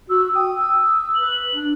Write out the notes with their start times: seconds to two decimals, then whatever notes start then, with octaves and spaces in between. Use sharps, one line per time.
0.10 F#4 E6
0.35 G5 D#6
0.55 E6
1.15 B4 F#7
1.56 D4